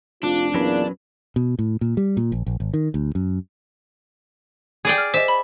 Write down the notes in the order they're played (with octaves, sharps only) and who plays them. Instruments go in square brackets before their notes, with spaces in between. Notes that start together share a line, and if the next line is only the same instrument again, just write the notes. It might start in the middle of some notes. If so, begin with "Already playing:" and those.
[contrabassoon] F1 [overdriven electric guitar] D4 [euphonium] F4
[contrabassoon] E2 [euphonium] A#2 [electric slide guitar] F#3 C#4 B4
[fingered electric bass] B2
A2
A#2
G3
A#2
A#1
A#1
G#1
D#3
D2
F#2
[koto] G#4 D5 G5
[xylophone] F6
[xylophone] C5 D#5 [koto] E5
[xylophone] B5